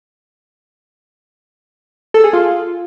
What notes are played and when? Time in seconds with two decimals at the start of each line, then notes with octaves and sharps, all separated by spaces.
2.14 A4
2.24 G#4
2.33 F4